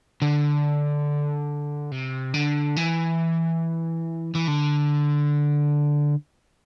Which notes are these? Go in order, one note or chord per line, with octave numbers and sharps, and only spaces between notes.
D3
C3
D3
E3
E3
D3